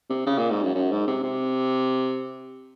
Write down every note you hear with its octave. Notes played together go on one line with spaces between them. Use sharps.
C3
C#3
A#2
G#2
F#2
F#2
G#2
C3
C3